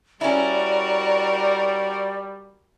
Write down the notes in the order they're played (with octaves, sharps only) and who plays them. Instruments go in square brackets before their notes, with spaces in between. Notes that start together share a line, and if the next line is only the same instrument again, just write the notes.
[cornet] G3 [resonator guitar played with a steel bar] C#4 E4 [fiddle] F#4 A#4 [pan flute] D5